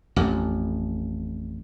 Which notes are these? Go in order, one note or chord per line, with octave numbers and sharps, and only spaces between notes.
A1 F2